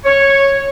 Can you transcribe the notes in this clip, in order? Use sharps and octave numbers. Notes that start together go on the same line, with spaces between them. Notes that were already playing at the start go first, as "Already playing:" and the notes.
C#5